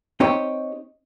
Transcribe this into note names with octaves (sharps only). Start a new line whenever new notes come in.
C4 D#4 G4 C#5 D#5